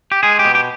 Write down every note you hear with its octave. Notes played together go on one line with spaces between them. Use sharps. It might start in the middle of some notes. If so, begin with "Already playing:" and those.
G4
G#3 G#4
G4
B2
G4